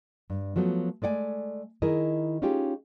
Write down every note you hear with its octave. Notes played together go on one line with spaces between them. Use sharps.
G2
F3 F#3 A3 B3
G#3 A3 D5 F#5 G#5
D#3 E4 G#4 A#4 D#5
C#4 D#4 F4 G4 G#4